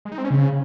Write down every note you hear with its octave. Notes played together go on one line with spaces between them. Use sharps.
G#3
D#4
C4
C#4
C#3